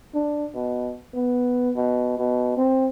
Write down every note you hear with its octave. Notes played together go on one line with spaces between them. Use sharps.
D4
B2
B3
B2
B2
C4